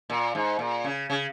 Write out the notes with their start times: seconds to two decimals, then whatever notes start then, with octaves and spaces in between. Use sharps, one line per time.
0.10 A#2
0.35 G#2
0.59 A#2
0.84 C#3
1.10 C#3